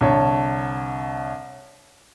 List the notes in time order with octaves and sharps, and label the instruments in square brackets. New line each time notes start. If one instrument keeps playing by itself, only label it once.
[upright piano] C2 D3 C#5 A5